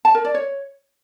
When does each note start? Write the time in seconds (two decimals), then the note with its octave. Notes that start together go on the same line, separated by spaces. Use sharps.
0.05 A5
0.15 A#4
0.25 D5
0.35 C#5